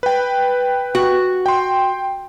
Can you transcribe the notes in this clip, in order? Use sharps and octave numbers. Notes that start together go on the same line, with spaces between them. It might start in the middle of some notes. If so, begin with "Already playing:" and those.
B4 G5
F#4
G5 C6